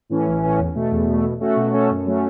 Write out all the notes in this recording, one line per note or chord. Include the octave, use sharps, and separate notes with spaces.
A2 E3 C#4
A1
A2 E3 C#4
E2
B2 A3
E2
B2 A3
B2
A3 C#4 F#4 A4
B2
A3 C#4 F#4 A4
F#2
F#3 A3 C#4